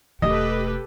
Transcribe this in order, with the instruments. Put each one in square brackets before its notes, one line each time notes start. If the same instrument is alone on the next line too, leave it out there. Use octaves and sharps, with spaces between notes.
[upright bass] E1 A3 [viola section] G4 A4 B4 [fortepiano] D#5